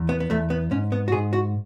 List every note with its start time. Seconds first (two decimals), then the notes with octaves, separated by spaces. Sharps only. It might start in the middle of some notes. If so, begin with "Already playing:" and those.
Already playing: E2
0.09 B3
0.20 B3
0.30 E2 A3
0.50 B3
0.71 G#2 C#4
0.92 B3
1.08 F#4
1.12 G#2 G#4
1.33 F#4